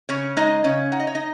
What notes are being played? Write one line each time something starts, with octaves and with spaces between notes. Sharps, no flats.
C#3 C#4 C#5
G#3 D#4 D#5
C#3 C#4 C#5
D#4 F#5
D#5
C#5
D#4 D#5